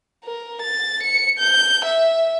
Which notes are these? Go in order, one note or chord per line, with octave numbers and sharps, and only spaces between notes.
A#4
A6
C#7
G6
E5